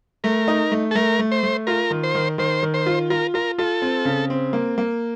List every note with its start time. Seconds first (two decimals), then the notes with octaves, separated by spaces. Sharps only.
0.24 A3 A#4
0.48 D#4
0.72 A3
0.91 A4
0.95 A3 A#4
1.19 A3
1.32 C5
1.43 A3
1.67 F4 A#4
1.90 D#3
2.04 C5
2.15 D#3
2.38 D#3 C5
2.63 D#3
2.74 C5
2.86 F4
3.10 F4 A#4
3.34 F4 A#4
3.58 F4 A4
3.82 C4
4.05 C#3
4.30 C4
4.53 A#3
4.78 A#3